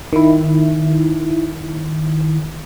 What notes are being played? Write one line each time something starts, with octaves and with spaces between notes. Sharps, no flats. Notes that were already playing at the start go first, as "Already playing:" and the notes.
D#3 E4